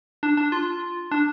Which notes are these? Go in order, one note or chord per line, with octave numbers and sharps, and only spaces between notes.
D4
D4
F4
D4